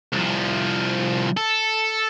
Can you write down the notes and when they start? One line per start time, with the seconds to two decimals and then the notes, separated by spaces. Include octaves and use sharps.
0.13 C2 F3
1.37 A4